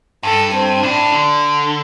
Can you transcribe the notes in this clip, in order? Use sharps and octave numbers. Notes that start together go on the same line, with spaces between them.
G2 A4
C4
A2 D4
D3